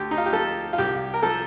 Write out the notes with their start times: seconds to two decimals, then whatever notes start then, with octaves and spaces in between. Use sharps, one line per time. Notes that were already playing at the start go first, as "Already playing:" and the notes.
Already playing: D2 G4
0.11 D#4
0.18 F4
0.26 G4
0.33 F3 A4
0.73 F4
0.78 C2 G4
1.14 A#4
1.22 F3 A4